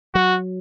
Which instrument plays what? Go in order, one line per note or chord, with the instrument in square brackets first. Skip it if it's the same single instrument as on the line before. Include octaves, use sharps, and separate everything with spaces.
[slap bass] F#3 [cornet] F#4